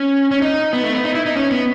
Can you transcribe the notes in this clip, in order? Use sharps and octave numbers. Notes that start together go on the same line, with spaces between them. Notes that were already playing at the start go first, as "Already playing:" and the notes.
Already playing: C#4
C#4
D#4
B3
A3
B3
D#4
E4
D#4
C#4
B3